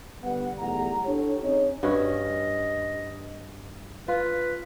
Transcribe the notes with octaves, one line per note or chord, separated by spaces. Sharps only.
G1 G3 B3 F#5
B1 E2 G3 A3 F#5 A#5
D4 E4 G4 A4 C#5
C4 C#4 D#4 G#4 C#5
G2 C#4 F#4 D#5
F4 B4